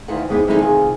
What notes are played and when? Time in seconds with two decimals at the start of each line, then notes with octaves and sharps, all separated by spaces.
0.08 D2 D#3 E3 F4 F#5
0.29 D#2 G#2 G#3 B3 E4 G4
0.47 D3 E3 G#3 A3 C4 D#4
0.61 C3 D#3 F4 G#4